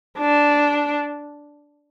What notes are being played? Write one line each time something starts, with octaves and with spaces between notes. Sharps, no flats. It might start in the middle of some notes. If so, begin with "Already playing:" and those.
D4